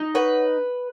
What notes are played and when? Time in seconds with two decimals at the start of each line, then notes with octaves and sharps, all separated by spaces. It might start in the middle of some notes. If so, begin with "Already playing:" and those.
Already playing: D#4
0.15 B4 C#5 F#5